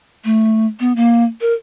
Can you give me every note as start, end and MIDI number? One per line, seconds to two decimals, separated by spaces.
0.25 0.66 57
0.80 0.93 59
0.96 1.24 58
1.41 1.53 70